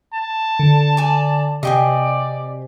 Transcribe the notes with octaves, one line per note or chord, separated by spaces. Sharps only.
A5
D3
D5 G#5
C3 D5 D#5 G5 G#5